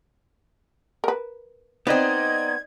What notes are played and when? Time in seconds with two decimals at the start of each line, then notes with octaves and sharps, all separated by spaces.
1.04 A#4 B4
1.87 B3 C4 D#4 D5 D#5 G#6